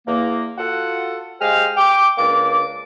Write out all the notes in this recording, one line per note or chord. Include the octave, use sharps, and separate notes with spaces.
E2 A#3
F4 F#4 A4 F#5
G#3 G4 G#4 C5 F5 F6
G5 D6
C#2 A#3 D4 D5 D6